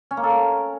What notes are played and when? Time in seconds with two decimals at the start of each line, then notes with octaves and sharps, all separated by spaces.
0.11 C#4
0.17 A#3
0.23 A4
0.30 A#4